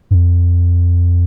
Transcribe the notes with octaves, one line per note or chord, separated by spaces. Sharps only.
G2
F2